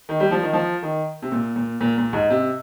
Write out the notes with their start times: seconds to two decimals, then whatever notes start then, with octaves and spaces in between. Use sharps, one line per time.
0.09 D#3
0.20 G3
0.31 F3
0.43 D#3
0.53 F3
0.82 D#3
1.22 C3
1.32 A#2
1.56 A#2
1.81 A#2
1.98 A#2
2.13 G#2
2.30 C3